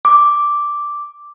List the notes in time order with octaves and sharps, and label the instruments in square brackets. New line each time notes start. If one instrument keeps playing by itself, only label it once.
[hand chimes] D6